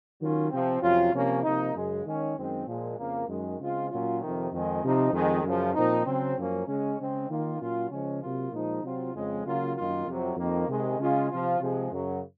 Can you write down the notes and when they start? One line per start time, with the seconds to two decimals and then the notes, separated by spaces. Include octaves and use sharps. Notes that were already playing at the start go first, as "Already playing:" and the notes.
0.20 D#3 F#3 C#4 F4
0.50 C3 F3 C4
0.82 F2 C3 F#3 C#4 F4
1.12 C3 F3 A#3 C#4
1.43 C3 F3 A#3 D#4
1.74 F#2 C#3 G#3
2.04 D#3 G#3 C#4
2.36 F#2 D#3 G#3 C4
2.67 A#2 F3 G#3
2.97 F2 C#3 F3 A#3
3.28 F#2 D#3 G#3
3.58 C#3 G#3 C4 F4
3.90 A#2 F#3 C#4 F4
4.20 F2 C3 D#3
4.52 F2 D#3 G#3
4.82 C3 F3 C4 D#4
5.13 F2 D#3 G#3
5.44 F#2 C#3 F3
5.75 A#2 F3 C4 D#4
6.06 C#3 F#3 C4
6.37 F#2 F3 A#3 C#4
6.67 C#3 G#3 C#4
6.98 C#3 G#3 C4
7.29 D#3 A#3 F4
7.60 A#2 F#3 C#4 F4
7.90 C#3 F3 G#3 C#4
8.21 C3 F#3 A#3 F4
8.52 A#2 F3 G#3 D#4
8.82 C3 F#3 C4 F4
9.14 F2 C#3 G#3
9.45 C#3 F#3 A#3 F4
9.75 F#2 D#3 A#3 F4
10.06 F2 C3 F#3
10.37 F2 D#3 A#3
10.68 C3 D#3 G#3
10.98 C#3 G#3 C#4 F4
11.29 C3 F3 C4 F4
11.60 C3 F3 G#3
11.91 F#2 C#3 F#3